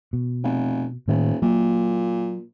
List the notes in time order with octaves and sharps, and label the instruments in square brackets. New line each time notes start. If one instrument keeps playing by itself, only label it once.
[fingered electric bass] B2
[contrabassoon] F1
[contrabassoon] D#1 [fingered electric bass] A2 D#3
[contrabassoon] A#2 [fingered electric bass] F#3 A#3